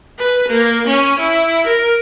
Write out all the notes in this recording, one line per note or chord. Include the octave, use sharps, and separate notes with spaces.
B4
A#3
C#4
E4
A#4